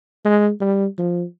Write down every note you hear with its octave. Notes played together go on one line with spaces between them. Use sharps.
G#3
G3
F3